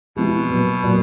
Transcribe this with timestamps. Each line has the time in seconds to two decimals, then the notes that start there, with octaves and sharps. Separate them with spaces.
0.16 B2 F3 G#3 C4 E4 G4
0.50 A#2 F#3 B3
0.83 A#2 F#3 B3